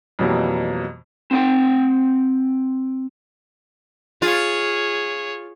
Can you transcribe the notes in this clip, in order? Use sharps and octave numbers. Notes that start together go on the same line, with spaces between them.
F2 B2 E3 F#3 G3 A#3
C4 F#5 G5
F4 G#4 C#5